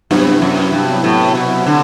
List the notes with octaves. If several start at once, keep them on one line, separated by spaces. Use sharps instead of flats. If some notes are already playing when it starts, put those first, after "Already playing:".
G2 C3 F#3 B3 E4
F#2
G2
A2
B2
D3